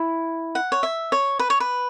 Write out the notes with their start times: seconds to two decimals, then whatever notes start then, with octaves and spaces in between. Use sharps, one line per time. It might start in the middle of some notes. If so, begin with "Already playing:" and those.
Already playing: E4
0.55 F#5
0.72 C#5
0.83 E5
1.12 C#5
1.39 B4
1.50 C#5
1.60 B4